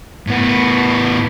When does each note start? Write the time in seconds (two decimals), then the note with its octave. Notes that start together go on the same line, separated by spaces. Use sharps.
0.27 A2 B3